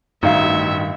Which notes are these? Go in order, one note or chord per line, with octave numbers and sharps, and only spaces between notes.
A1 G2 D#3 D#4 F#4 E5 F5